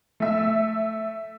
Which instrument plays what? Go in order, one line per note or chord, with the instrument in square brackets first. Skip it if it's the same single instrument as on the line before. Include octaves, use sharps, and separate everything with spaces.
[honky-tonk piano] A3 E5